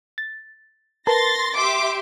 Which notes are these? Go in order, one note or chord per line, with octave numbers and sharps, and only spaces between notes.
A6
A#4 B4 A5 C6 A6 A#6
G4 E5 C6 D6